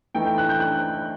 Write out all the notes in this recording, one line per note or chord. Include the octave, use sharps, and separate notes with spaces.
E3 A3 D#4 G5
G5
F#6
G6
F#6